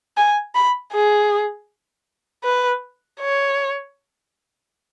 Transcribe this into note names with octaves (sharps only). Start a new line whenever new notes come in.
G#5
B5
G#4
B4
C#5